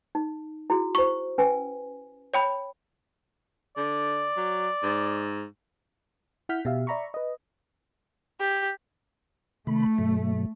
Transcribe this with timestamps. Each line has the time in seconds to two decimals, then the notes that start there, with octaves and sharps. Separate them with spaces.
0.15 D#4
0.70 E4 F#4 G#4
0.95 E4 C5 C#6
1.38 C#4 B4 G#5
2.34 C#5 G5 B5
3.77 D3 D5
4.37 F#3
4.83 G#2
6.49 E4 F#5 F6 G6 B6
6.65 B2 G4 E5 F5
6.87 D5 E5 A#5 B5 C#6
7.14 B4 D#5
8.40 G4
9.67 C3 D#3 A3 B5
9.98 G2 B2 F#3